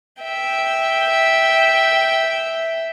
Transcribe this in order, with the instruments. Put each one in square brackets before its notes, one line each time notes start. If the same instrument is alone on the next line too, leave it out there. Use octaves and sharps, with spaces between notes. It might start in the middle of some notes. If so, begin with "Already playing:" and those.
[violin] E5 G5